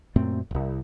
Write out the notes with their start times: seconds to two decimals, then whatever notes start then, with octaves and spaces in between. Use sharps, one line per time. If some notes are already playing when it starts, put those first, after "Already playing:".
0.16 F#2 A#2 A3 C4
0.51 D#1 C2